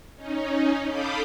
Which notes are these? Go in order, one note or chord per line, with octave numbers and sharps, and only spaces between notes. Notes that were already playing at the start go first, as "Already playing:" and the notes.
C#4 D#4
A4 F5 B5 D6 D#6 G6